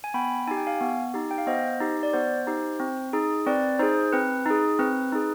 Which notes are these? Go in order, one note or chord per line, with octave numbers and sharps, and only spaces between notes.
G#5
B3 G5 B5
D#4 G4 G#5
G5
F5 G#5
B3
D#4 G4
G5
F5
B3 C5 D#5
D#4 G4
D5
B3 C5
D#4 G4
C4
D#4 G#4
C4 B4 D5
D#4 G#4 C5
C4 B4
D#4 G#4
C4 B4
D#4 G#4